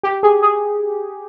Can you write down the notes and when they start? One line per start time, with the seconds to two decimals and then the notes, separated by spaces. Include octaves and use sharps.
0.03 G4
0.23 G#4
0.42 G#4